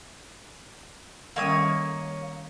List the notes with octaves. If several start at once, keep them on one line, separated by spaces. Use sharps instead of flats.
D#3 G3 A#3 C#4 C#5 D#6